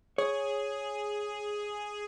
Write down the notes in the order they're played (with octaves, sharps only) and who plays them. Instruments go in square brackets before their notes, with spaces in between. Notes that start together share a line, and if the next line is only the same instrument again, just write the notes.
[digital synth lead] G#4 [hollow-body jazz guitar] C#5